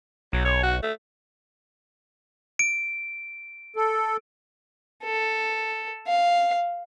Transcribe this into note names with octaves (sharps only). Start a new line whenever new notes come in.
B1 F#3
C#5
F#4
A3
D7
A4
A4
F5